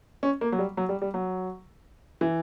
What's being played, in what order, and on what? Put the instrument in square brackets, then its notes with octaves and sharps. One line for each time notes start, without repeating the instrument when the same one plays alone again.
[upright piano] C#4
A#3
F#3
G3
F#3
G3
G3
F#3
E3